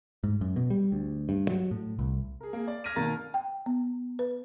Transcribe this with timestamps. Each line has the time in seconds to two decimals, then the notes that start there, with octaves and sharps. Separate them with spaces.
0.24 G#2
0.41 F#2
0.56 B2
0.70 G3
0.92 D2
1.29 G2
1.49 F#3
1.71 A2
1.99 C2
2.41 G#4 A#4
2.53 A#3 G#4
2.68 D5
2.84 F6 G#6 A#6 B6 D#7
2.96 B2 D#3 A#3 A#4 A#5 A6
3.34 G5
3.66 B3
4.19 B4